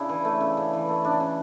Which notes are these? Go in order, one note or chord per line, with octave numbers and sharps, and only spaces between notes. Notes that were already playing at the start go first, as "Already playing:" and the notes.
Already playing: C#3 D4 E4
E3
A3
C#3
C#3
E3
A3
C#3 D4
C#3